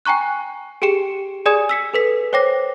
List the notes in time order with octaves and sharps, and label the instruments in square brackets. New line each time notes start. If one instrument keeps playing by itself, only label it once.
[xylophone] G5 G#5 A#5 C#6 F#6
G4 G#4 G5 C#7 E7
G#4 D5 G#5 D#6 G#6 E7
E6 B6 C#7
A4 B4 B6
C5 C#5 G5 D6 A#6